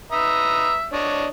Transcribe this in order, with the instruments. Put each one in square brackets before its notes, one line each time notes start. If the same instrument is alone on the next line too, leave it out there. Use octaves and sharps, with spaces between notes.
[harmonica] B4 A#5 D#6 [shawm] E5
[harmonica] D4 C#5 D#5